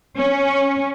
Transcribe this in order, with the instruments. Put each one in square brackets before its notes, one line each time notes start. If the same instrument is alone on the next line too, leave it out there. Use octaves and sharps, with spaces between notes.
[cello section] C#4